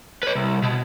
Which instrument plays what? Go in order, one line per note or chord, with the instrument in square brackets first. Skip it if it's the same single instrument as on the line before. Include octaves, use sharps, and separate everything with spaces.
[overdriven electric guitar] B4 C#5
C2
B2